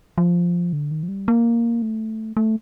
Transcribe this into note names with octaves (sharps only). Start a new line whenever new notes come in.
F3
D3
D#3
F3
G3
A#3
A3
A3